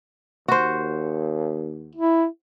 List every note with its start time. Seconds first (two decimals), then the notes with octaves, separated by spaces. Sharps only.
0.48 D#2 F#4 C5
1.95 E4